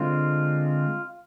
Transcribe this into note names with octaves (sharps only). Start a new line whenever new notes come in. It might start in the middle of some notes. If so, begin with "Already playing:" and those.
Already playing: D3 G#3 C4 F4